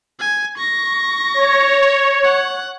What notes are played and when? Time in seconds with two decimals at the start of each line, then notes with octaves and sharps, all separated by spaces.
0.20 G#5
0.58 C#6 A#6
1.34 C#5
2.24 F#5